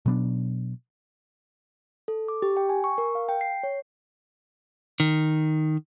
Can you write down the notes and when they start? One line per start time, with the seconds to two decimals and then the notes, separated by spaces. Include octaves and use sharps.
0.06 B2 F#3 B3 D4
2.08 A4
2.28 D6
2.42 G4
2.57 G5
2.69 G#5
2.84 C#6
2.98 A#4
3.15 F5
3.29 G5
3.41 C7
3.63 C#5
5.00 D#3